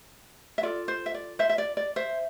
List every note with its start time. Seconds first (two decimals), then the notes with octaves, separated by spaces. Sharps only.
0.58 E5
0.63 F4 A4 D5
0.88 C5
1.06 E5
1.14 D5
1.39 C5 E5
1.50 E5
1.58 D5
1.77 D5
1.96 C5 E5